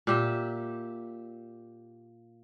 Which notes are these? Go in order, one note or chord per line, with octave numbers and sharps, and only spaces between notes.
A#2 G4 E5